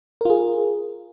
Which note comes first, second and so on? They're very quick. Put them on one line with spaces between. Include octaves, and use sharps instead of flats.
A#4 F4 G#4